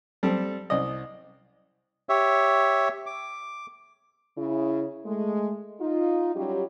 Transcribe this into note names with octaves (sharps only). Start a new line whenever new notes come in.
G3 C4 A4
C2 D5 D#5
G4 C#5 E5
D6
C#3 E4
G#3 A3
D#4 F4
F#3 G3 C#4 F4 G4